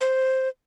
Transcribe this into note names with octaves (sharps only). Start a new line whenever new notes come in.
C5